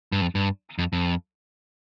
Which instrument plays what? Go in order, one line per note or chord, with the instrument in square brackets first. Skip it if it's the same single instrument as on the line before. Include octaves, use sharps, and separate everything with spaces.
[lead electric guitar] G2
F2
G2
F2
F2